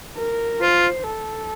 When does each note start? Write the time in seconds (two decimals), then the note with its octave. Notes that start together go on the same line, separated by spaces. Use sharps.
0.17 A#4
0.61 F4 C5
1.04 A4